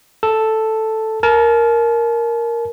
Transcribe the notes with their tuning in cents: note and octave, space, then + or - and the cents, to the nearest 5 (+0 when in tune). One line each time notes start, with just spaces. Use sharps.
A4 +0 A5 +0
A#4 +0 A5 -40